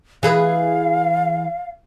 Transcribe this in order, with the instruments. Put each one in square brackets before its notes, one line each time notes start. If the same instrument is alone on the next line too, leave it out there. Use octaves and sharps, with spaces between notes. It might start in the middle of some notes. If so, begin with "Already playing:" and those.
[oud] E3 G#4 B4 [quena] F5